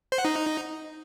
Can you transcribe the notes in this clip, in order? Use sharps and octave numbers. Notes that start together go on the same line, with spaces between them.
C5
F#5
D#4